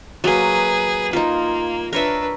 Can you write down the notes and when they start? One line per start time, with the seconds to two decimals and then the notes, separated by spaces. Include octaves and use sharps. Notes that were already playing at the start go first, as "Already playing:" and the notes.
0.24 F#3 A#3 G#4 B4
1.13 A#3 D#4 F4
1.93 D4 A#4 B4 C#5 E5